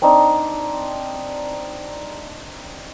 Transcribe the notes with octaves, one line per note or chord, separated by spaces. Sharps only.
C4 D4 D#4